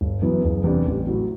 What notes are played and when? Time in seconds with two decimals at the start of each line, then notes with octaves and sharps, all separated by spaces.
0.01 G1
0.22 F#2 E3 B3
0.44 F#1
0.64 E2 C3 G3 D4
0.86 A1
1.07 A2 F#3